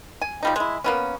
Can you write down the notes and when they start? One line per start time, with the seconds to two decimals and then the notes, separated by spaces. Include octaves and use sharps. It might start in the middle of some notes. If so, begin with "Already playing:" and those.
0.22 G#5
0.43 F3 G3 D#4
0.56 G#3 E4
0.84 A#3 B3 C#4